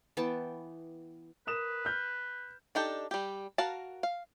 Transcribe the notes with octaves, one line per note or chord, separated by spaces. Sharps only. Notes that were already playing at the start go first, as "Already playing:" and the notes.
E3 B3 G5 A5
A#4 B4 D#6 E7
F6 G6
D4 D#4 G4 A4
G3 G4
F#4 A#4 F5 A5
F5